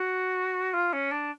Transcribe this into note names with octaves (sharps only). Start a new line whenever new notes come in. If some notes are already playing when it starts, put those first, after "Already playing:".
Already playing: F#4
F4
C#4
D4